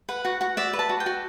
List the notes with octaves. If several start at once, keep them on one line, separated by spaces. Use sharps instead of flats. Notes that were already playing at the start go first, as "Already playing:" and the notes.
B4 F#5
F#4 F#5
F#4 F#5
D5 E5
B4
A5
F#4
G5
F#4